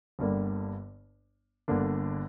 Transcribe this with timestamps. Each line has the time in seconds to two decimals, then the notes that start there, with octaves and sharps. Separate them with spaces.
0.19 G1 G2 D3 G3 A#3
1.68 G1 G2 D3 A#3 D4